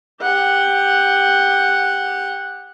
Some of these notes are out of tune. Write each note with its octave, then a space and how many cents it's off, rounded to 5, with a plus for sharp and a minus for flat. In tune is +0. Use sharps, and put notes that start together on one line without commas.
G4 +10 F#5 +0